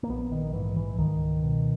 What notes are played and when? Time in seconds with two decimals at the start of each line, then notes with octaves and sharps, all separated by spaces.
0.03 A#3
0.09 A#1 B3
0.32 D#3
0.53 G#2 E3
0.76 E3
0.98 C#2 D#3
1.43 B2